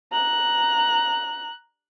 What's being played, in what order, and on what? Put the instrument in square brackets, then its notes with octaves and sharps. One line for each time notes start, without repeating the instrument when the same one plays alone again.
[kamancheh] A#5 F#6